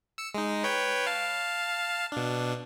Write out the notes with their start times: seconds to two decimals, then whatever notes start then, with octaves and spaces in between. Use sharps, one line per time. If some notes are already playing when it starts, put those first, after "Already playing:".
0.18 E6 C#7
0.34 G#3 D#4
0.64 B4 C#5 G5
1.07 F5 A5
2.12 B2 D4